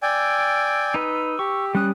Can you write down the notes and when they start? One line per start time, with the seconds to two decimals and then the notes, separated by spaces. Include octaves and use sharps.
0.03 D5 G5 G#5 E6
0.94 D#4 B4
1.39 G4 C#6
1.75 G3 C#4 D#6 F#6